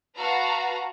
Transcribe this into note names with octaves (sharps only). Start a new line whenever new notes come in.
F#4 B4 F5 A5 A#5